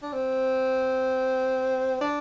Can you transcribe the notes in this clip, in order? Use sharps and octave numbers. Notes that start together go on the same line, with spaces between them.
D4
C4
D4